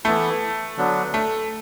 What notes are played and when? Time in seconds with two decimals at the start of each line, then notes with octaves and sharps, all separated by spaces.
0.04 E3 A3 B3 E4
0.77 D3 F#3 B3 D4
1.14 A3